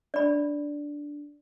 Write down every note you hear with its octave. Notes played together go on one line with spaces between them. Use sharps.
D4 D5 B5